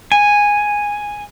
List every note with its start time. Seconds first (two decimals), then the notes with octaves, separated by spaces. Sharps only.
0.12 G#5